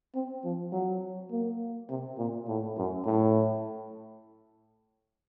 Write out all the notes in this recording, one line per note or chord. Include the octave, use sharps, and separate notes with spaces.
C4
F3
F#3
A#3
C3
A#2
A2
F#2
A2